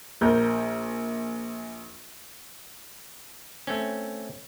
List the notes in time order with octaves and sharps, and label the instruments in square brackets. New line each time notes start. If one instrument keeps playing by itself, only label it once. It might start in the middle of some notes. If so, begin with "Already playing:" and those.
[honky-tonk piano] A#1 A#4 G6
[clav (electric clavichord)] A3 C4 C#4